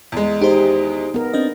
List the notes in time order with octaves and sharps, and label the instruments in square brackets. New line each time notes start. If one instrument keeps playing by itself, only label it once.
[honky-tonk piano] E2 G#3
[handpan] D#4 G#4 [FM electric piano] G4 C5 D#5
[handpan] B3 A#4
[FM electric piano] C4 D4 D#5